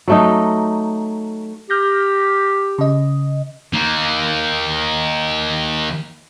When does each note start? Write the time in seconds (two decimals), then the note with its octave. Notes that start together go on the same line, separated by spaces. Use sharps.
0.08 F#3 A3 D#4
1.70 G4 F6 G6 A#6
2.78 C#3 D#5
3.73 D#3 A#3